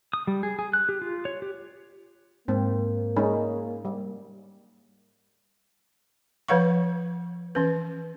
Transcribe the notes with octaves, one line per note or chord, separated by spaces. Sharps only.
D#6
G3
G#4
G#4
F#6
G4
F4
C#5
G4
G#2 A#3 C4
G#3 C#4 D#4
G3
F3 B4 C#5 F5 F#5 C#6
E3 C#4 B4